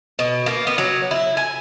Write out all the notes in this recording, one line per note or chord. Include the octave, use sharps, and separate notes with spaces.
B2
A#3
B3
F#3
E4
G#5